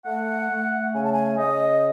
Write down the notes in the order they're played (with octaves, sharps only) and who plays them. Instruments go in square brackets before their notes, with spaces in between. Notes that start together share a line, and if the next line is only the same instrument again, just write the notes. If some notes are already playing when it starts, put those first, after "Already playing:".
[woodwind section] A3 F#5
A3
C#3 G#5
A5
G#5
C#3 D#5